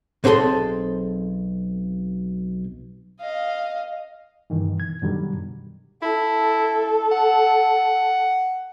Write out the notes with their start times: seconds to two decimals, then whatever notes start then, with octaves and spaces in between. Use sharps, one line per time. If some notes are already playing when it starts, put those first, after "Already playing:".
0.24 B1 C4 G#4 A4 C6
3.20 D#5 F5
4.50 G2 B2 D#3 E3
4.80 G#6
5.02 F#2 B2 D3 D#3 F#3 G3
6.02 E4 A4
7.12 F#5